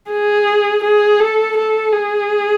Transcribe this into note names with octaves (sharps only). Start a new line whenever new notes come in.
G#4
G#4
A4
A4
G#4